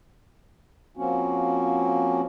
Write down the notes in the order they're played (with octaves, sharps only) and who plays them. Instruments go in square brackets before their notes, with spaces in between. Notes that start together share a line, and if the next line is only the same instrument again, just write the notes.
[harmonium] F3 A#3 C4 C#4 F#4